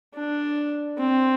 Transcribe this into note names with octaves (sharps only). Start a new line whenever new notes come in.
D4
C4